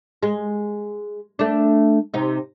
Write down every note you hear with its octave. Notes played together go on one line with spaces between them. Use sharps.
G#3
A3 D4
C3 D#4